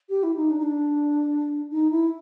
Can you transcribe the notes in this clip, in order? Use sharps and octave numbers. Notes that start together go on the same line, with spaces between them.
G4
E4
D#4
D4
D#4
D4
D#4
E4